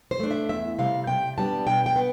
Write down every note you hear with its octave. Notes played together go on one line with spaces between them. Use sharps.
C5
A3 D4
E5
E2 E5
C3 G3 F5
C3 G5
G3 B3 D4 A5
B2 G5
G5
B3